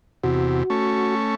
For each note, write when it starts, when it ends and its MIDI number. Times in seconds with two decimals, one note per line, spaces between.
0.23 0.63 40
0.23 0.63 48
0.23 1.15 66
0.70 1.35 57
0.70 1.35 61